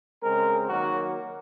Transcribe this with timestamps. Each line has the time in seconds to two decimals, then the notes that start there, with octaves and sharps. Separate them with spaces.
0.22 C#3 G#3 C4 A#4
0.69 D#3 F#3 A#3 F#4